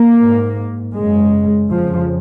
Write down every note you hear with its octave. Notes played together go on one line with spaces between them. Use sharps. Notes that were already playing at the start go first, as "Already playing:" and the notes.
Already playing: A#3
G#2
F#2 C#3 G#3
F2 C#3 F3